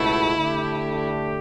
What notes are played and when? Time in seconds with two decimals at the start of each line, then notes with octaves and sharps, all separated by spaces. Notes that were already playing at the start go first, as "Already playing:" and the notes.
Already playing: C#2 B2 A3 E4
0.37 D3 A3 D4 G4